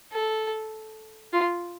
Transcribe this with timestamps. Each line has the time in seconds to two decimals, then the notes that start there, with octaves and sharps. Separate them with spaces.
0.13 A4
1.33 F4